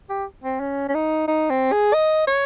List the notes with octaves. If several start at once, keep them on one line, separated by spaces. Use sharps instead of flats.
G4
C4
C#4
C#4
D#4
D#4
C4
G#4
D#5
C#5